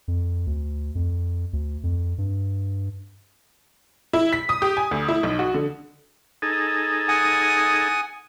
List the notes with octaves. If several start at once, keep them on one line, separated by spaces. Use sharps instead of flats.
F2
D2
F2
D2
F2
G2
E4
B6
D#6
G4
G#5
D2
E4
B1
F#4
D3
D#4 G#4 A4
F#5 G#5 D#6